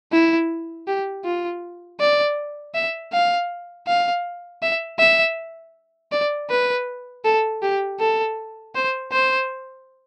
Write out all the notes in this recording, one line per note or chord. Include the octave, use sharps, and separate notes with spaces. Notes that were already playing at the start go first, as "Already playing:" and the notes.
E4
G4
F4
D5
E5
F5
F5
E5
E5
D5
B4
A4
G4
A4
C5
C5